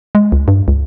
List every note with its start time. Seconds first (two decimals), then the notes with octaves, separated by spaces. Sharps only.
0.15 G#3
0.32 C#2
0.48 G2
0.68 C#2